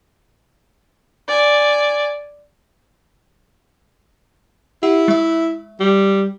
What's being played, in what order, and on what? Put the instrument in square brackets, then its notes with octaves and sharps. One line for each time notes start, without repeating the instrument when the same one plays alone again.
[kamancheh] D5 G#5
[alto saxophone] E4 [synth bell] G4 F#5
[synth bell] G#3 E5
[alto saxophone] G3